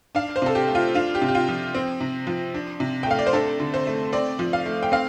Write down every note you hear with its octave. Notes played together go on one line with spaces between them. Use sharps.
D4 F5
C5
C3 A4
G4
A3
F4
D4 F4
G4
C3
G4
F4
F3
C4
C3
F3
D4
C3
G5
A3 F5
D5
C5
D4 A4
D3
C5
A3
C4 D5
F3
F5
A3
G5
C4 F5